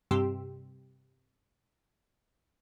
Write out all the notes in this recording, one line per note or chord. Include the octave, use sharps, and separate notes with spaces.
G2 C3 G4 C6 E6